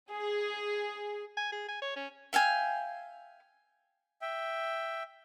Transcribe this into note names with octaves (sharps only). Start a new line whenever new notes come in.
G#4
G#5
G#4
G#5
C#5
C#4
E5 F5 G5 G#5
E5 G5